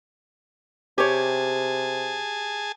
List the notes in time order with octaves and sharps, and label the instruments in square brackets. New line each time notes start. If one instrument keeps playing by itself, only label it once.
[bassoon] C3 [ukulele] G4 C#5 [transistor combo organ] G#4 G#5 A5